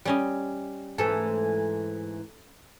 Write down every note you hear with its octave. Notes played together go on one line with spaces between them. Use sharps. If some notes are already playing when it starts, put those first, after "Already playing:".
G3 C#4 D#5
G#2 E3 A3 A4